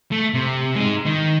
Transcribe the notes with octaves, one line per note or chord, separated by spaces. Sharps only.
A3
C3
G#3 D#4
D#3